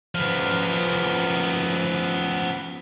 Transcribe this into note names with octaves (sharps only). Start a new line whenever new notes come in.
F3 B3